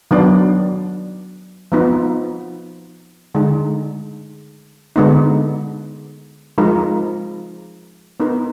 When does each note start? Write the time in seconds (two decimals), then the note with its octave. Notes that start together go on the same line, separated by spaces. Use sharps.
0.11 D#3 F#3 B3 D4
1.72 F3 B3 D#4
3.34 D3 G#3 D#4
4.96 D3 G#3 B3 D#4
6.58 F3 G#3 D#4 A#4
8.20 B3 D#4 A#4